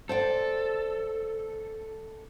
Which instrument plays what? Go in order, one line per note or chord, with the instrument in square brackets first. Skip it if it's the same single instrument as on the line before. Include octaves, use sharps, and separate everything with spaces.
[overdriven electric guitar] A4 [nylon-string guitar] C5 D5 G5